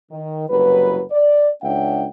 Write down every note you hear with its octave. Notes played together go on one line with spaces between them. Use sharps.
D#3
F#1 C2 F#3 B4
D5
C#2 C#4 D4 E5 F#5 G5